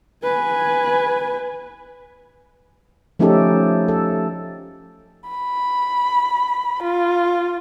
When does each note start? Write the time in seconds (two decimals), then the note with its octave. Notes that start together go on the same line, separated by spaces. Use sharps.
0.24 B4 G#5
3.19 F3 A3 C#4 D#4 G4 A4
3.88 A4
5.30 B5
6.83 F4